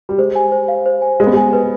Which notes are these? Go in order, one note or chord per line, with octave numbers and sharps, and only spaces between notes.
G3
G#3 C5
G#5
C5
F5
C5
G#5
G#3 B4
B3
G#3 G#5
B4